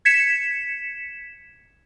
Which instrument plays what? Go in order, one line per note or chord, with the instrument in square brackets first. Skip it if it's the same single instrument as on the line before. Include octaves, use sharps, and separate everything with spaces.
[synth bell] G#6 B6 C#7 E7